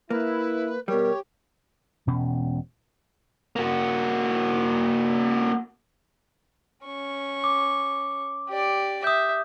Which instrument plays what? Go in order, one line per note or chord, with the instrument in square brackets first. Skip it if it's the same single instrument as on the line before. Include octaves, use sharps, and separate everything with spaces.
[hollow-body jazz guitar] A#3 [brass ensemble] E4 [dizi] B4
[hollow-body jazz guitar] B2 G3 [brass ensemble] G4 [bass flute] A#4 [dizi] C#5
[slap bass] E1 B2 C#4
[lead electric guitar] A#3 F#4
[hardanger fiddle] C#4 C#6
[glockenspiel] D6
[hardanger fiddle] G4 D5
[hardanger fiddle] E5 [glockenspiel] D#6 G6